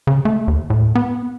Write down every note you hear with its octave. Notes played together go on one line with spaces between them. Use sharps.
C#3
A3
D#2
A2
B3